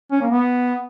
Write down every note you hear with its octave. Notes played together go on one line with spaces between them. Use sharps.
C#4
A#3
B3